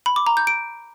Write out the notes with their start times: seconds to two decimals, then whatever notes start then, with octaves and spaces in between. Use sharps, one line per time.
0.06 B5
0.16 D6
0.27 A#5
0.37 G6
0.47 D7